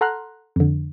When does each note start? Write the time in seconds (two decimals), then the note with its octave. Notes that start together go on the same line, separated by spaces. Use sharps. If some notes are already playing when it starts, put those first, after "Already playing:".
0.01 A4 F#5 A#5 C6 F6 F#6
0.56 F2 D3